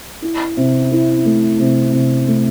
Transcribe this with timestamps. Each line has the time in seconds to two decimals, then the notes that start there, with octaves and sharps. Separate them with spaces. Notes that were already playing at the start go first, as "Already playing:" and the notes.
0.22 E4
0.57 C3
0.91 E4
1.25 A3
1.60 C3
1.93 C3
2.28 A3